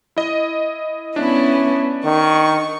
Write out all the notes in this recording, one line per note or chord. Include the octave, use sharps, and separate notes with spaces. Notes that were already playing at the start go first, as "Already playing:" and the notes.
E4 D#5
B3 C#4 D4 E4
D#3 C#6